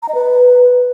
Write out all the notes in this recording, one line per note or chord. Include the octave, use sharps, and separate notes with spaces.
A#5
D#5
B4